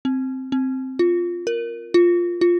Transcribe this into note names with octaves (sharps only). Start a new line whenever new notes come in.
C4
C4
F4
A#4
F4
F4